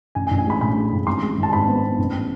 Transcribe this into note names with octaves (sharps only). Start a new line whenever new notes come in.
A1 G#5
G#5
A1
G#5
G#3 B5
A2 B5
G#3
A1
G#1 C6
G#3
G#1
A5
G#2 B5
B3
B3
A1